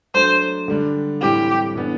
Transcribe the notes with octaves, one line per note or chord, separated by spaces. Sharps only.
F#3 A3 D4 C5
D3 G3 D4
A2 E3 G3 C4 G4
A2 E3 B3 D4